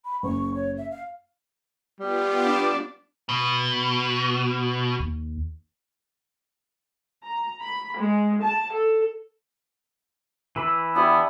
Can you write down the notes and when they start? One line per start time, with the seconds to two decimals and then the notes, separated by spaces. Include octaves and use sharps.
0.05 B5
0.23 F#1 C#6
0.54 C#5
0.78 E5
0.91 F5
2.00 G3 B3 F4 G4
2.46 D4
3.29 B2
5.00 D#2
7.24 A#5
7.61 B5
7.97 G#3
8.43 A5
8.73 A4
10.56 E3 B5 D6 E6
10.95 B3 D4 E4 G4